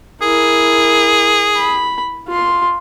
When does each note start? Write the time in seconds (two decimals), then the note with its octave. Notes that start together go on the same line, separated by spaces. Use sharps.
0.22 E4 G#4 A#4
1.56 B5
2.28 F4 C6